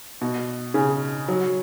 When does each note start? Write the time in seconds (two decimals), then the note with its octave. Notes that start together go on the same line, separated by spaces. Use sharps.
0.21 B2
0.74 C#3
1.28 F#3